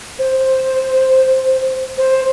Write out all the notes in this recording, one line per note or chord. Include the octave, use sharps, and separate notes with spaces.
C5
C5